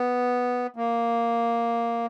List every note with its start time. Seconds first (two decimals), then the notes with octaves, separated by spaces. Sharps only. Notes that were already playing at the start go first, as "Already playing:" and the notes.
Already playing: B3
0.76 A#3